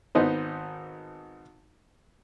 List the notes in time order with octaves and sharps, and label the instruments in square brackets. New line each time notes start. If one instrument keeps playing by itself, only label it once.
[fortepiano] G#1 B3 D#4 C5